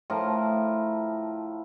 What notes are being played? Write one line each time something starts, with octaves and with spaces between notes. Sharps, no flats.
A2 F3 A#4